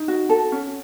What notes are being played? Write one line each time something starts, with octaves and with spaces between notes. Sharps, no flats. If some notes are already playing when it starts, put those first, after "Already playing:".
Already playing: D#4
F#4
A4
C#4